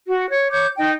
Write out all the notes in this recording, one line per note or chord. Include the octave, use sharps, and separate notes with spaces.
F#4
C#5
C#5 D6 G6
D#4 D#5 G5